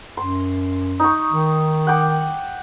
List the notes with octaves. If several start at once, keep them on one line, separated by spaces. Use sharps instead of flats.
F#2 C6
D#4 C#6
D#3
F#5 G5 D6